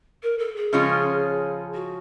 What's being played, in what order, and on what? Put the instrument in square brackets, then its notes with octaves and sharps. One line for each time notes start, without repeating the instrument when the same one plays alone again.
[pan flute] A#4
A4
G#4
[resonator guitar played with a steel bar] C#3 F3 G#3 C#4 F4
[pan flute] F#4